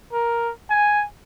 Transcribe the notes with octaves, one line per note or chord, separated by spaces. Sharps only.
A#4
G#5